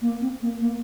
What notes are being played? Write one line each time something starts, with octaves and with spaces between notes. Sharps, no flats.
A#3
C4
A#3
A#3